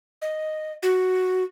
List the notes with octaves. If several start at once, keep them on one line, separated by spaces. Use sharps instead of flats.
D#5
F#4